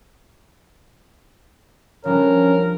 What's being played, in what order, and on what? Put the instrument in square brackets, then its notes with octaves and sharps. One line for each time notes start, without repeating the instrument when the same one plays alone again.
[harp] F3 G3 D4 [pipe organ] C#4 [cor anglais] A#4